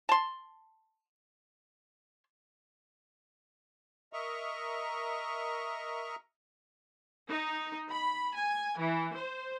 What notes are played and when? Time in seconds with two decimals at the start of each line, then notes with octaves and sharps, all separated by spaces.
0.09 A5 C6
4.13 A#4 D#5 E5 A#5 C#6
7.28 D#4
7.89 B5
8.35 G#5
8.78 E3
9.14 C5